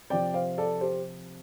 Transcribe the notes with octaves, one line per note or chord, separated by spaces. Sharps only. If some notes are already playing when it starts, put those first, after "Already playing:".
C3 F3 C4 D5 G5
C5 F5
A4 D5
G4 C5